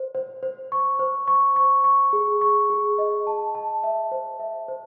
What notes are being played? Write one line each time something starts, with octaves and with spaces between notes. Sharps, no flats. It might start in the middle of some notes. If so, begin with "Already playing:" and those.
Already playing: C5
C5
C5
C#6
C5
C#6
C#6
C#6
G#4
C#6
G#4
D#5
A5
A5
E5
C5
E5
C5